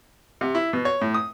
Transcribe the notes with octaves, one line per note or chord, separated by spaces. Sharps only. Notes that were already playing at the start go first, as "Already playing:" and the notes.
C3
E4
B2
C#5
A2
D#6